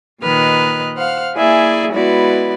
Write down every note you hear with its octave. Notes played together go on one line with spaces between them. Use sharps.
A#2 D#3 B4 D#5 F6 F#6
C5 F5 F#5 F6
A#3 E4 G#4 D5 E5 G#5
G#3 B3 E4 F#4 B4 D5